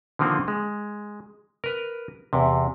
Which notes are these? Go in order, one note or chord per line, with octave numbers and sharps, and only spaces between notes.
D3 D#3 F3 A#3 C4
G#3
A#4 B4
E2 C3